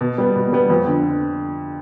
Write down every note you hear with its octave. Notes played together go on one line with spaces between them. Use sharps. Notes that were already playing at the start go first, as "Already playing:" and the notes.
B2
G3 B3
B2
G3 B3
F2
D3